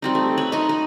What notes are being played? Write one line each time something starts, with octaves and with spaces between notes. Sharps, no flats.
G3 C4 D#4
A3
B4 C#5
D#4 D#5
D#4